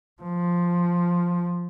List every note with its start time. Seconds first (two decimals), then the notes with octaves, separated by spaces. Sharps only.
0.22 F3